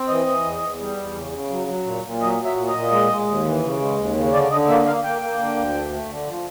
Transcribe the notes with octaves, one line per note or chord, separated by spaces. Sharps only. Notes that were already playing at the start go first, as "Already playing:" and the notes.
Already playing: C4
E3 D#5
E3
E2
E2
G3
E2
C#3
C#3
F#3
F#3
A#2
A#2
F#3 D#5
F#3
E5
A#2
D#5
A#2
G#3
G#3
D#2
E3
C#3
G#3
D#2
C#3
D3 D5
D3 D#5
A#3 E5
A#3 F5
A#3 G5
A#3
D3
D2
A3
A3
D3
F3